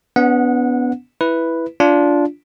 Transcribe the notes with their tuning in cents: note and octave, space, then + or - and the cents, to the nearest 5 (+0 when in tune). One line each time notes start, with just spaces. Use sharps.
B3 +5 D4 -40 F#5 -20
E4 +0 B4 +0
D4 -15 F4 +0